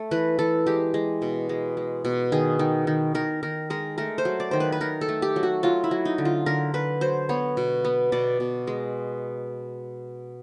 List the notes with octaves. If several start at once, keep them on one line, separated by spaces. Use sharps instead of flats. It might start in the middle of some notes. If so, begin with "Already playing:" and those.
Already playing: A3
E3 B4
E3 A4
G#3 G4
G#3
B2
G#3
G#3
B2
D#3 G#4
D#3
D#3
D#3 A#4
D#3 A#4
G#3 A#4
A3 A#4
C5
F#3
D5
D#3 C5
B4
B4
D#3 A#4
A4
A3
G4
F#3
F#4
F#3 F4
E4
F#3
D#4
D3
F4
D3 A#4
D3 B4
F#3 C5
B3 C#5
B2
B3
B2 D5
B2
G#3